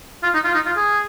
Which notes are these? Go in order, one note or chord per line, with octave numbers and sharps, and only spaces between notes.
F4
D#4
F4
D#4
F4
G#4